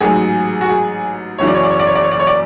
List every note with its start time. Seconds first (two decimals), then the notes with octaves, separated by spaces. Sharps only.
0.01 A1 G#2 F#3 G#4
0.61 F#4
0.69 G#4
1.38 F#1 F#2 C#3 E3 C#5
1.47 D5
1.55 C#5
1.63 D5
1.71 C#5
1.80 D5
1.87 C#5
1.95 D5
2.03 C#5
2.11 D5
2.19 C#5
2.27 D5